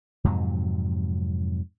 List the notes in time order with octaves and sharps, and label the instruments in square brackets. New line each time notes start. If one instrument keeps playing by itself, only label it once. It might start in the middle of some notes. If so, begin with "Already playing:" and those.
[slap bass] F2 G#2 C3 F#3